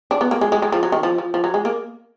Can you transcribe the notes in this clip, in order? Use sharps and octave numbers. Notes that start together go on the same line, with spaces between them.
D4
B3
A#3
G#3
G#3
G#3
F3
F#3
D#3
F3
F3
F3
F#3
G#3
A#3